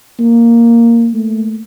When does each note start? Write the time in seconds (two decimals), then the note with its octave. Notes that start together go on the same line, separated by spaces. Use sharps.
0.19 A#3
1.14 A3